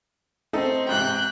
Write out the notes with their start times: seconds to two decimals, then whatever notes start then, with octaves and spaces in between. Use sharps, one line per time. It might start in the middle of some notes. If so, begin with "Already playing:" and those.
0.53 A3 C4 D#4 A4
0.88 A1 G#2 C3 G5 F#6